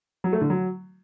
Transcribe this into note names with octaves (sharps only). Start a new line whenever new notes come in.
F#3
A3
D3
F#3